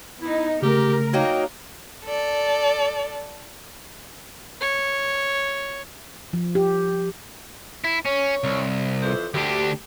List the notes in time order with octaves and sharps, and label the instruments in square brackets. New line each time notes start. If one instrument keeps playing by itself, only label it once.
[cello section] B3 D#4 [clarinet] E4
[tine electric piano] C#3 A3 [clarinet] G4 [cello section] A#4
[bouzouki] F#3 A#3 D#4 [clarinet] G5
[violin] A4 D5
[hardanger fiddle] C#5
[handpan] F3
G4
[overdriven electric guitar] E4
[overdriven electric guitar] C#4 [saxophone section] C#5
[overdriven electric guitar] C2
[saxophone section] F2 E3 C5
[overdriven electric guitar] D2 D4 [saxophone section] G4